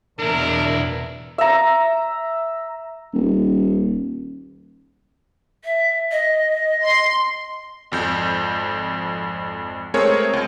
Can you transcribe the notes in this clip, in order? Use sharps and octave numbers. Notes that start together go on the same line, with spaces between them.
E2 B2 D4 E4 A#4
E5 A#5
D#1
E5
D#5
C6
G#1 F2 G6
G#3 A3 C4 G#4 A#4 C#5
C#2